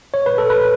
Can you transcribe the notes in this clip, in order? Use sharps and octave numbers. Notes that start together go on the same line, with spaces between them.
C#5
B4
A4
B4